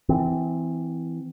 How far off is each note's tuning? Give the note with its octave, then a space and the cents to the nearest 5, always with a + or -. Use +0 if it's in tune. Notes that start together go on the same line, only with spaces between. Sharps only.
E3 +0 C4 -30